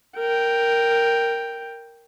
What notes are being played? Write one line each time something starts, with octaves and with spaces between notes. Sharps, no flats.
A#4 G5